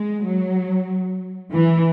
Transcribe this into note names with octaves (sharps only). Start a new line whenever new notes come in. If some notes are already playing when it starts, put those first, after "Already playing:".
Already playing: G#3
F#3
E3